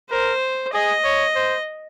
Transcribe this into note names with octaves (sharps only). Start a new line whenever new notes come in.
A#4 C5
G#4 D#5
C#5
C5